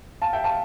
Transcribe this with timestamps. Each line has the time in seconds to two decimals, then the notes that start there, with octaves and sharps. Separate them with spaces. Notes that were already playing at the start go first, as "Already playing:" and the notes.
0.22 F5 A5
0.33 E5 G5
0.44 F5 A5